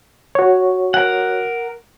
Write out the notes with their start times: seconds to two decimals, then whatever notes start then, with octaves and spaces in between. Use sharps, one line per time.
0.35 F#4 C#5
0.94 A#4 F#5